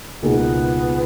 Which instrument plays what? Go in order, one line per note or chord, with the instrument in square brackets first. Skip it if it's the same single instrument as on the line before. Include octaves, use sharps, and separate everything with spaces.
[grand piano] C#2 B2 A#3 D#4 G#4 [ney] B3